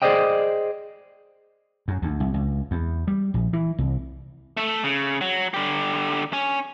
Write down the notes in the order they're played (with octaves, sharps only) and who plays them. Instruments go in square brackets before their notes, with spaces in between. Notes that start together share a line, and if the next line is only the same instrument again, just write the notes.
[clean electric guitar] G#4 A#4 C5 D5 D#5 G5
[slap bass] F#2
D2
C2
C#2
E2
G3
A#1
E3
C2
[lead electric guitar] A3 A4
C#3
F#3
D3 G4
C#4